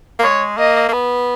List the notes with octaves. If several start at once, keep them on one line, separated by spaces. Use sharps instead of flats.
A#3
G#3 C#5
A#3 D#5
A#3
B3